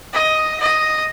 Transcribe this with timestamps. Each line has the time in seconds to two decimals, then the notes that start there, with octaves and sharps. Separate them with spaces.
0.13 D#5
0.60 D#5